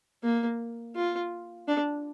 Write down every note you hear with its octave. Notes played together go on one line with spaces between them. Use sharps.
A#3
F4
D4